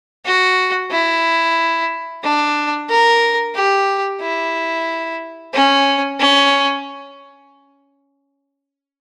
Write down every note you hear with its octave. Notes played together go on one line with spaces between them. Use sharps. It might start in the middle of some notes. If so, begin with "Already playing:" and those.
F#4
E4
D4
A#4
G4
E4
C#4
C#4